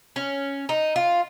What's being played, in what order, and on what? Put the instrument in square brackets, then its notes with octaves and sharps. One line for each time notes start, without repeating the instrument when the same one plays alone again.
[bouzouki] C#4
D#4
F4